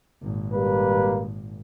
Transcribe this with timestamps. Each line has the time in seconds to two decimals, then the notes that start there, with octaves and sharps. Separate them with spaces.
0.22 G#1 A#2
0.53 G3 A#3 B4